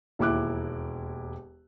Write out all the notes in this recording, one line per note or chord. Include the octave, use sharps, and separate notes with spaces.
E1 D#2 E4 D6 F#6